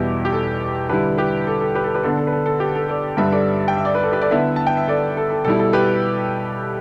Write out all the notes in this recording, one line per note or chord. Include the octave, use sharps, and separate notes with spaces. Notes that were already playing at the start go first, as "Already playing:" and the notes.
Already playing: E2 B2 G3 E4 G4
G4
A4
D3 G3 E4 G4 B4
G4 B4
A4
A4
G4 B4
A4
G4 B4
D3 B3 D4 A4
A4
B4
A4
A4
G4
A4
A4 D5
G2 D3 G3 B4 E5
A4 D5
G5
E5
D5
B4
A4
G4 B4
A4 D5
D3 B3 E4 B4 E5
A5
G5
E5
A4 D5
A4
A4
B2 G3 E4 A4
A4
G4 B4